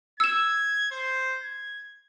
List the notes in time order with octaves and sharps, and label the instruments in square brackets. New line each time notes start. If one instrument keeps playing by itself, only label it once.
[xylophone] E6 E7 [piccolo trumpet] G#6
[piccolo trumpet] C5
G#6